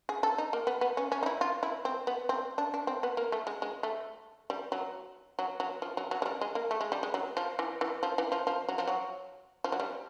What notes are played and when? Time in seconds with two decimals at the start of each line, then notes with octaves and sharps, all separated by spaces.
0.09 G#4
0.23 A4
0.38 D#4
0.53 A#3
0.67 B3
0.81 B3
0.97 C#4
1.12 C#4
1.23 D#4
1.26 E4
1.41 F4
1.63 E4
1.85 C4
2.07 B3
2.29 C4
2.58 D4
2.74 D4
2.87 C4
3.03 B3
3.17 A#3
3.32 A3
3.47 G#3
3.62 G#3
3.83 A3
4.50 G3
4.72 F#3
5.39 F#3
5.60 F#3
5.82 F3
5.97 F#3
6.11 F#3
6.22 G#3
6.26 G3
6.41 G#3
6.55 A#3
6.71 A3
6.81 G#3
6.92 G3
7.03 G#3
7.14 F#3
7.37 F3
7.59 E3
7.81 E3
8.03 F3
8.18 E3
8.32 F3
8.47 F3
8.68 F#3
8.78 F3
8.87 F#3
9.64 F3
9.72 F#3
9.80 G3